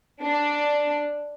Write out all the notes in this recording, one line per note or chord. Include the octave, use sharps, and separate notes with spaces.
D4